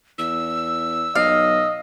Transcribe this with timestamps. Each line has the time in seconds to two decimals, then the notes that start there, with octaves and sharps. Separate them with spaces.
0.18 E2 E6
1.15 B1 D#5 F5